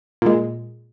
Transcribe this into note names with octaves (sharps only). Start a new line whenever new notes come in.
A#2 G#3